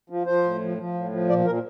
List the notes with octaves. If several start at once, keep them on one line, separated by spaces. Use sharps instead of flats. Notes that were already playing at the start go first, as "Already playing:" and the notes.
F3
F3 C5
A2
F3
F3
A2
F3
A#2 D5
A#2 A#4